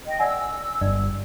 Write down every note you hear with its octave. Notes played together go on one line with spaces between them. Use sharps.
D#5 G5
D5 F#5 G#5 E6
G1 G2 D5